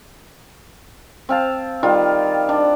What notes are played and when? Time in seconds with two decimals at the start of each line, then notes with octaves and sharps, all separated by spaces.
1.29 C4 F5 A5
1.83 D#3 G3 F4
2.49 D4